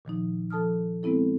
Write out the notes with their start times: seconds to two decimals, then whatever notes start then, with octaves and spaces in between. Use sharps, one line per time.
0.05 A#2 D#3 F3 D#4
0.50 F3 A4 A5 D#6 F6
1.03 G#3 B3 C4 E4 A4